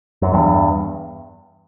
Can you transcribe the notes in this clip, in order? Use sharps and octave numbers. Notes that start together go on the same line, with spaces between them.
F#2
E2 G2